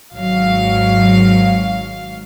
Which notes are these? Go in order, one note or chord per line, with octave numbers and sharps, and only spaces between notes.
G#1 G#2 F#3 F5